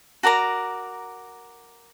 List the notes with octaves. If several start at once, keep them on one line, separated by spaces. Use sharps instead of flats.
F#4 A#4 D5 A#5